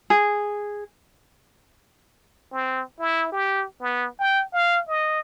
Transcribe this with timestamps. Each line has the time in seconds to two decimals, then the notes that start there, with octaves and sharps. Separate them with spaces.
0.10 G#4
2.52 C4
2.99 E4
3.32 G4
3.81 B3
4.19 G5
4.53 F5
4.88 D#5